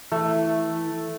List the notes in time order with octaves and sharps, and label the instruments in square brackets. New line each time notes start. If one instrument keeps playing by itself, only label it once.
[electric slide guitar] E3 [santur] A3